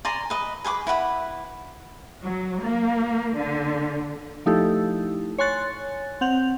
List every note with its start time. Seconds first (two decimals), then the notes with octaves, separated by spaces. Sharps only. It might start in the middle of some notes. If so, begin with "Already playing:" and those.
0.05 D5 G#5 A#5 C6
0.30 B4 D#5
0.65 G#4 B4 C6 D6
0.87 E4 B4 F#5 B5
2.23 F#3
2.66 A#3
3.37 D3
4.46 F3 A3 D#4 E4 G4 A4
5.38 C#5 G#5 C6 F#6 A6
6.21 C4 F#5 G6 F7